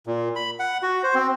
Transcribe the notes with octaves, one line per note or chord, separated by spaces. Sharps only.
A#2
B5
F#5
F#4
C5
C4